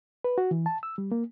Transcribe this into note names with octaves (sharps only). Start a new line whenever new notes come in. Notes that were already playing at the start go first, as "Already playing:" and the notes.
B4
F#4
E3
A5
E6
G3
A#3